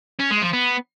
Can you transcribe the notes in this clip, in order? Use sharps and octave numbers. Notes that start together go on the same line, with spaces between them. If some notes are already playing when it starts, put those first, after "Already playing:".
C#4
G#3
F3
B3